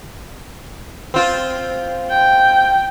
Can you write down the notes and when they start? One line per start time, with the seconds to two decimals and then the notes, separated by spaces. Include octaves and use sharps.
1.14 C4 F4
2.10 G5